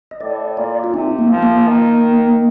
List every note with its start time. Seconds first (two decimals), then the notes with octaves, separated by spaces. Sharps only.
0.11 D#5
0.21 A2 D5
0.57 A#2 D5
0.84 F4
0.94 C3 D#4
1.19 A#3
1.31 F3
1.43 A#3
1.67 D#3